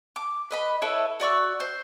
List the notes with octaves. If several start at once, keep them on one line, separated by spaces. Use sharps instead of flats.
D6
B4 D#5 B5
E4 A4 B4 C#5
F#4 D5 C#6 E6
C5 G6